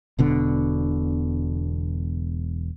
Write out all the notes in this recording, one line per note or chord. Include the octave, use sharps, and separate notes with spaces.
E1 B2 D3